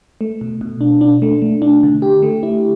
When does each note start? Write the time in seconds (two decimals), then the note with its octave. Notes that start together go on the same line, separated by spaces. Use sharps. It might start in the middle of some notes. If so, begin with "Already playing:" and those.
0.21 A3
0.41 B2
0.61 B2
0.81 D4
1.01 D4
1.22 A3
1.42 A3
1.62 D4
1.83 D3
2.02 G4
2.22 A3
2.43 E4